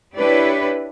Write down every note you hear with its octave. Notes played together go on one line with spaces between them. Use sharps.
D4 E4 G4 B4 C#5